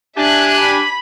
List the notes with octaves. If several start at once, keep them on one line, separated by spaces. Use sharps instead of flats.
D4 G4 E5 G#5 F#6
B5